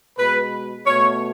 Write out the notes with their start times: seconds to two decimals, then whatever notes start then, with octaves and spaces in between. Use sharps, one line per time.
0.18 B2 G#3 B4
0.86 B2 A3 C#5